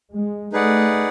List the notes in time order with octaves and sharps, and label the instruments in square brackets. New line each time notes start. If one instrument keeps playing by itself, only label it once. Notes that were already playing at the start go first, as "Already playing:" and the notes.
[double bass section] G#3
[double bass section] A3 [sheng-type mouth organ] D#4 G#4 B4 D5 F#5